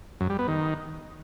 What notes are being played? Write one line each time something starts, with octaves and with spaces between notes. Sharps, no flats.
F#2
G3
B3
D#3